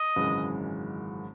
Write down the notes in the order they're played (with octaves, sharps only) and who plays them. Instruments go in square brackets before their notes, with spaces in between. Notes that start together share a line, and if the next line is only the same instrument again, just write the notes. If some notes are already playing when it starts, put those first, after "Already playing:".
Already playing: [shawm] D#5
[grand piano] G#1 F#2 C#3 E3 G#3